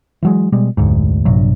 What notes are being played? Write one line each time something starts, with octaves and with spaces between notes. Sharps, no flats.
E3 F#3 G#3
B2 G3 G#3
F1 D2 G#2
A#1 G2 C3 F#3